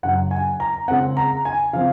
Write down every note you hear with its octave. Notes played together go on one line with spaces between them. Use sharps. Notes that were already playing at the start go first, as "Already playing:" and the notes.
F#2 C#3 F#3 F#5
G#5
A#5
C#3 G#3 C4 F#5
A#5
G#5
C#3 F3 C4 F5